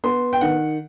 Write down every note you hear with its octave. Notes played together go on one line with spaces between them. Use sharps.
B3 C6
G5
D#3 F#5